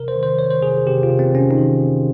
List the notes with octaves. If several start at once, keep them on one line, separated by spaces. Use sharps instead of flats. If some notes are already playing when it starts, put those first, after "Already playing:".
Already playing: C3 A#4
C5
D#3
C5
D#3 C#5
C5
C3 G#4
C3 G4
F4
C3
C4
C3 C#4
D#4
D#3